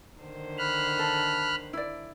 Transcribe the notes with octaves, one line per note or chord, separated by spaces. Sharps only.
D3 D#3 C5
B5 F6 F#6
A4
E4 D5